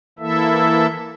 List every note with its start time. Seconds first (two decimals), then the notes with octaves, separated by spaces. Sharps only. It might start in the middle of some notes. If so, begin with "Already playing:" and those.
0.19 E3 A#3 E4 A4 E5